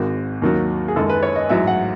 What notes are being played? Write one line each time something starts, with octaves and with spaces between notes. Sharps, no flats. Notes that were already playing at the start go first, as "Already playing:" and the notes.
Already playing: G#1 G#2 D#3 F#4
D#2 D#3 F#3
G#4
F#2 D#3 G#3 A4
B4
C#5
D#5
A1 G#2 F#3 E5
F#5